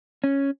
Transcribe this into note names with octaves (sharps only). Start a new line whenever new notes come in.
C#4